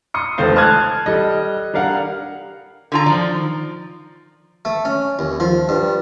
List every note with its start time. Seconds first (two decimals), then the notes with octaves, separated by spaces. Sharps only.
0.14 C6 D#6 C#7
0.38 F1 C#2 A4 C5 F5
0.56 A5 C6 D#6 F6 F#6 G#6
1.06 G3 A4 D#5
1.74 G3 D4 A#4 F5 F#5
2.92 D3 F4 A#5
3.06 D#3 F3 D5
4.65 A3
4.85 C#4
5.19 D#2
5.40 F3
5.69 G2